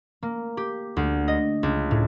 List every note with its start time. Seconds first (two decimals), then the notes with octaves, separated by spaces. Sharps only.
0.23 A#3
0.57 G4
0.97 D2
1.28 D#5
1.63 C#2
1.91 A2